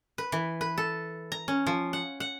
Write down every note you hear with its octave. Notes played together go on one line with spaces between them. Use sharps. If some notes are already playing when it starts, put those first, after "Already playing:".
B4
E3
B4
A4
A#5
C#4
F3
F#5
F#5